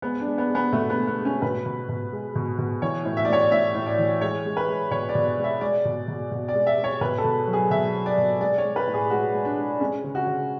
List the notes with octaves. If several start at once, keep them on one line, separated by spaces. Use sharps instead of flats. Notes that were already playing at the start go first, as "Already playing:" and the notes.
G#3 B3
D4
G#3
B3
G#3
B3
B2 A3
B3
G#3
B3
G#3
C#4
B2 B4
B2
B2
G#3
B2
B2
E3 C#5
A2
E5
D5
A2 C#5
D5
A2 E5
A2
D5
E3
G#3 C#5
G#3
B4
G#3
B2 C#5
D5
B2
D5
G#3
E5
G#3 D5
B2
B2
B2
D5
G#3
E5
G#3
C#5
B2 B4
A4
B2
F#3
G#4
B2 E5
F#3
D5
B2
G#3 D5
C#5
G#3
B4
A2
G#4
G#3 F#4
G#3
D4
G#3
G#3 C#4
C#3
F#4
C#3